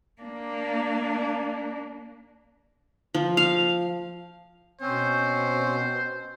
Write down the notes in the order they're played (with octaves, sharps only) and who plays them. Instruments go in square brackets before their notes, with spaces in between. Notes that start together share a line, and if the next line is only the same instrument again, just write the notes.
[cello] A#3 D4
[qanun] F3
F5
[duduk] B2 [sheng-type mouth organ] C4 C#4 [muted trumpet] C5